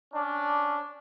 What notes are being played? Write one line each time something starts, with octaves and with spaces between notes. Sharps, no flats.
C#4 D4